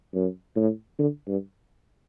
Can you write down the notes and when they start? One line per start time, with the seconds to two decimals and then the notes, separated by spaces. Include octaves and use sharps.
0.14 F#2
0.56 A2
0.99 D3
1.28 G2